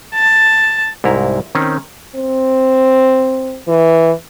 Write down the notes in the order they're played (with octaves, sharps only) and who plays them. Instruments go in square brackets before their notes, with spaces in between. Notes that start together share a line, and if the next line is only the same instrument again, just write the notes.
[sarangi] A5
[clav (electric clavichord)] C2 G#2 E4 A#5
D#3 C4 C#4
[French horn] C4
E3